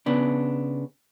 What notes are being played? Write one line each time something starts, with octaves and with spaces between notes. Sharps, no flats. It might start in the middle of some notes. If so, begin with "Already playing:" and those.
C#3 B3 D4